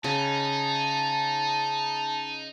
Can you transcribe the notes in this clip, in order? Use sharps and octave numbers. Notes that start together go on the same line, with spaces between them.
C#3 D#4 A5